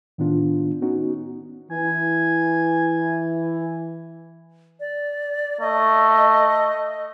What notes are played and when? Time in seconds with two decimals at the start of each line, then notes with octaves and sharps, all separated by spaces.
0.18 A2 D#3 B3 D4 F4
0.82 B3 C#4 D#4 F#4
1.71 E3 G#5
4.80 D5
5.61 A3 D#5